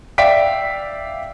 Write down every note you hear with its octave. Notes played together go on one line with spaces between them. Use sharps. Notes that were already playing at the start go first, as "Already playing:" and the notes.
D5 E5 F5 G5 B6 D7